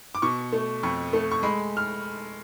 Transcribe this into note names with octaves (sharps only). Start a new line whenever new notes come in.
D6
B2 C#6
A3
F2 C#6
A3
C#6
G#3 B5
F6